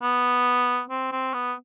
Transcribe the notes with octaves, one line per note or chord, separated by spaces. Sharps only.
B3
C4
C4
B3